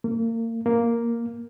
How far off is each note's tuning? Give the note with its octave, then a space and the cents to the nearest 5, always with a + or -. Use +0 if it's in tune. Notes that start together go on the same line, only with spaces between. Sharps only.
A#3 -35
A#3 +0